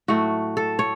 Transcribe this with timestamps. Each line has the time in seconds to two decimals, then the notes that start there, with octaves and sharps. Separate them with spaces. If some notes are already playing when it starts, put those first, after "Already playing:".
0.08 A2 F#3 A3 F#4
0.57 A4
0.79 C#5